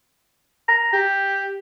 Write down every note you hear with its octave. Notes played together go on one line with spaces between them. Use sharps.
A#5
G4